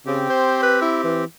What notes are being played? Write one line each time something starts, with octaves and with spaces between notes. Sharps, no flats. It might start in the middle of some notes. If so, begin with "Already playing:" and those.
C#3 C4 G4
C5
B4
E4
E3